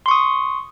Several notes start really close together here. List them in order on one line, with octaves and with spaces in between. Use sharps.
C6 C#6 D#6